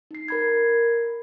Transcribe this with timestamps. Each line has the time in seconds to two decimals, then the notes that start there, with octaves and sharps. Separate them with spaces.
0.11 D#4 C7
0.28 A#4 B5 G#6